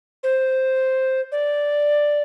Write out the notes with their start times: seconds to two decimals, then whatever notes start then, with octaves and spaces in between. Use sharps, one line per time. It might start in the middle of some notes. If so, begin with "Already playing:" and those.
0.23 C5
1.32 D5